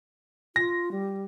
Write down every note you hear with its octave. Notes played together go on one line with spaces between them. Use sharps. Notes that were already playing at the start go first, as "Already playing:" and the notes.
F4 A#6
G3